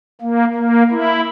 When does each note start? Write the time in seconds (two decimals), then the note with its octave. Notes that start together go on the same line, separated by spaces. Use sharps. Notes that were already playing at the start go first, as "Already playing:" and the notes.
0.21 A#3
0.55 A#3
0.90 E4